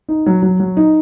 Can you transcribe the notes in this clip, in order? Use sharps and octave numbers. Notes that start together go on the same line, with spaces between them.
D#4
F#3
F#3
F#3
D#4